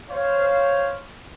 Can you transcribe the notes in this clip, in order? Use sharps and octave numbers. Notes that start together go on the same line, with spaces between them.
C5 C#5 F5